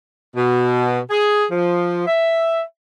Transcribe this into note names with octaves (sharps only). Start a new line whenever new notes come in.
B2
G#4
F3
E5